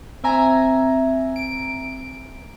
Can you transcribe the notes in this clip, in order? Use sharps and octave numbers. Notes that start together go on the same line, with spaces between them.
C4 E5 G#5 A#5
D7